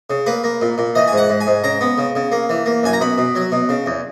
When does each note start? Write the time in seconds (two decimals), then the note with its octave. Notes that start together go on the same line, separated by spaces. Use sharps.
0.10 C#3
0.26 A#3 B4
0.44 A#3
0.61 A#2
0.78 A#2
0.95 E3 D#5
1.07 G#2 G#5
1.17 F#5
1.30 G#2
1.41 G#5
1.47 G#2
1.64 C#3 A#5
1.81 B3
1.98 C#3
2.15 C#3
2.32 A#3
2.49 E3
2.66 A#3
2.83 F#2 G#5
2.93 A#5
3.01 B2 B5
3.18 B2
3.35 F#3
3.52 B2
3.69 C#3
3.86 E2